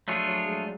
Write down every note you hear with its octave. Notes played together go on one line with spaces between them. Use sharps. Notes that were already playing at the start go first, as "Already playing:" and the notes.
F#3 A3 D4 F4 G#4 C#5
F#3
G#3